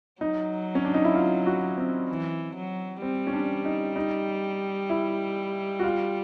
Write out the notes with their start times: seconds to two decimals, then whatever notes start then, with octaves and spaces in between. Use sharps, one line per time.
0.21 F#3 D#4
0.75 C#4
0.85 D4
0.94 D#4
1.05 E4
1.15 F4
1.46 F#4
1.77 C4
2.09 E3
2.56 F#3
3.02 G3 C4
3.27 C#4
3.33 D4
3.65 D#4
3.96 D#4
4.90 E4
5.79 F#4
5.84 F4